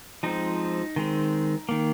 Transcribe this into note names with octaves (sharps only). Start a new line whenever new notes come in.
F3 G#3 C4 D#4
D#3 G#3 C4
D#3 A#3